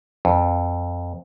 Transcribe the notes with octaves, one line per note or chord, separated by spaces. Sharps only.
F2